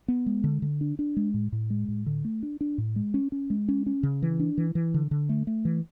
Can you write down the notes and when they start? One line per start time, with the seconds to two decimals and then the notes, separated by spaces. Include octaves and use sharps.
0.08 B3
0.26 G#3
0.44 D3
0.62 D3
0.81 D4
0.99 D4
1.17 G#3
1.34 A2
1.52 A2
1.70 G#3
1.88 A2
2.06 D3
2.25 A3
2.43 D4
2.61 D4
2.78 A2
2.96 G#3
3.14 C#4
3.32 C#4
3.50 G#3
3.68 C#4
3.86 C#4
4.03 C#3
4.22 E3
4.40 D4
4.58 E3
4.75 E3
4.94 D3
5.11 D3
5.29 A3
5.47 A3
5.65 E3